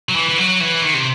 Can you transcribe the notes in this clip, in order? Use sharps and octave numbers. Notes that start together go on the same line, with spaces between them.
F#3
E3
E3
F#3
E3
D#3
C3